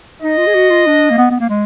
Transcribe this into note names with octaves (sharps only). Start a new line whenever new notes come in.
D#4 D#5
F4
G#4
F#4
F4
D4
A#3
B3
B3
A#3
G#3